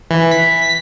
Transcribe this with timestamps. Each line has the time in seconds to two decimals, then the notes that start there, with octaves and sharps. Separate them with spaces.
0.11 E3
0.31 B6